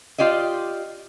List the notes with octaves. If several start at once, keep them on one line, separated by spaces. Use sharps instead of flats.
F4 G4 D5 D#5